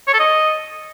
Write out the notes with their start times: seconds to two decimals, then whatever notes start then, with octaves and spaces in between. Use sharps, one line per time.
0.08 C#5
0.14 A4
0.19 D#5